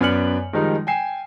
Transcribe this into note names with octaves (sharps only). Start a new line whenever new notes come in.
F#2 B3 D5 F6 C#7 F#7
D#3 F3 G3 G#3 D#4
G5 G#5 C7 E7